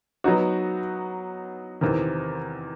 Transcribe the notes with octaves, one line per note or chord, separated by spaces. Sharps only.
F#3 B3 D#4 F#4
E2 C3 D#3